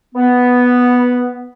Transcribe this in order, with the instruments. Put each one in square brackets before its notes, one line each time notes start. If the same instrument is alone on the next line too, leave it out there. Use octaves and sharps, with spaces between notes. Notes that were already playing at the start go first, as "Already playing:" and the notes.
[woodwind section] B3